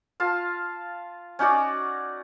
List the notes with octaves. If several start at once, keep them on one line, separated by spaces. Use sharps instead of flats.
F4 F5 A5
C#4 D#4 F#4 D5